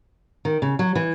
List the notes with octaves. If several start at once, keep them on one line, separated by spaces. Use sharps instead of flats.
D#3
C#3
F#3
E3